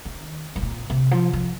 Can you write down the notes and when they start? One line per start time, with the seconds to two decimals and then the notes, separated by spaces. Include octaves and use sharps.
0.05 D#3
0.56 G#2
0.62 A#2
0.90 C3
1.11 F3
1.33 F3